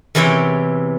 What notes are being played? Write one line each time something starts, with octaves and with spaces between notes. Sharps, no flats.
E2 C3 E3 E4 C#5 G5